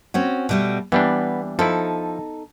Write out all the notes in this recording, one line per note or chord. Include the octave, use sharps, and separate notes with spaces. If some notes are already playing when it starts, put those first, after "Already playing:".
C4 C#4 F#4
B2 G3 A3
E3 G3 B3 D4
F3 D#4 E4 A4